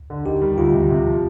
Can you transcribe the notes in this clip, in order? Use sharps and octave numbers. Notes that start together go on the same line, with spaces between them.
D3
D#3 G4
G3
D2 F4
C3
C3
F3